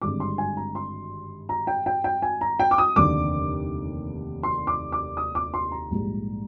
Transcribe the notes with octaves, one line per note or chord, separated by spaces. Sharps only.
G#1 G2 D3 G#3 D6
C6
G#5
A#5
C6
A#5
G5
G5
G5
G#5
A#5
G5
D6
D#6
F1 D#2 D3 D6
C6
D6
D6
D#6
D6
C6
A#5
A#1 G#2 G3